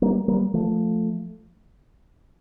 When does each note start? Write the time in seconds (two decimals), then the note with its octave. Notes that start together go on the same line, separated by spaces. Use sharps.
0.02 G3 A#3
0.28 G3 A#3
0.54 F3 A3